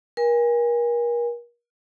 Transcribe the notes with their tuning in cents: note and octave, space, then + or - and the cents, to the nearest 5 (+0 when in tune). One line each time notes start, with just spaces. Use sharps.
A#4 +35 G#5 -30